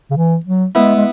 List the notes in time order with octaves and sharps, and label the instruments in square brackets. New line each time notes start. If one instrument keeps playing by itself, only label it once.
[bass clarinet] C#3
E3
F#3
[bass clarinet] G#3 [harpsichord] B3 E4
[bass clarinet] G#3